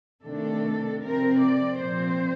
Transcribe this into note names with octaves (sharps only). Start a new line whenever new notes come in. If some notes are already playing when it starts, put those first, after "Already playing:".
C3 D#3 A3 D4 A4
C3 F3 C4 A#4
D5
A#2 F3 C4 C5